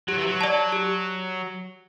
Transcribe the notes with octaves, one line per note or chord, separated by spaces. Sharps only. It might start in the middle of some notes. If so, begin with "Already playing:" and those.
F#3 G4
E3
F#3
D5 A5
G4